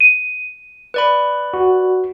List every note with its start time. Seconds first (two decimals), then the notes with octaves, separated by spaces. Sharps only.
0.01 D#7
0.94 B4 D5 B5
1.54 F#4